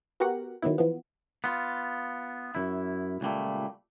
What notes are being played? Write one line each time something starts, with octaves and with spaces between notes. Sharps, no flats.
B3 F#4 G4 A#4 F#5
D#3 F#3 B3 E4
E3 F3 B3
B3 F4
F#2 E4
C#2 A#2 G3 A3